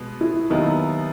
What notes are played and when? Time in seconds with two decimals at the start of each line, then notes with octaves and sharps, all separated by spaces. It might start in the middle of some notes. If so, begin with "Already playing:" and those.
Already playing: B2 G#3 B3
0.21 E4
0.50 D#2 D#3 F#3 B3 D#4 E4